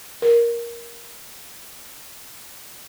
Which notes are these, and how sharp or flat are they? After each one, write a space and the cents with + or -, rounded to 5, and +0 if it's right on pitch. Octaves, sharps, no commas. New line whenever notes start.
A#4 +10